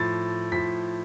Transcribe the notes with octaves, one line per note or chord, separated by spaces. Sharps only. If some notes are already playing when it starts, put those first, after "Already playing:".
Already playing: A2 F3 A6
A2 F3 B6